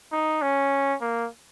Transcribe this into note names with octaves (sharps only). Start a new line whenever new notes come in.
D#4
C#4
A#3